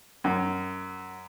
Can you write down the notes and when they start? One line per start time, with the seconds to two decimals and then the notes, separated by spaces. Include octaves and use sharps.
0.24 F#2